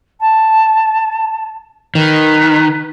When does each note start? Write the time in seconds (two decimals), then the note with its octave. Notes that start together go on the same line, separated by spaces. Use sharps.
0.20 A5
1.95 D#3 B4